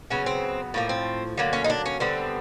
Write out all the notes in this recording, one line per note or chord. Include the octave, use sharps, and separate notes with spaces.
C#3 F#3 B3 C#4
C4
A2 F3 A#3
C4
D3 F#3 A#3
C#4
D#4
D4
C#4
D3 G3 B3 C4